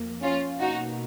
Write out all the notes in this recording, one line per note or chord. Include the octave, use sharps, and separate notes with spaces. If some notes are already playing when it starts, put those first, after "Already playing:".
Already playing: F2 F3 A#3
C#4 F4
B2 A#3 D#4 F#4